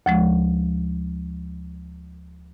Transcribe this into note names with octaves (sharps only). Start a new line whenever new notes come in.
D2 F3 G#3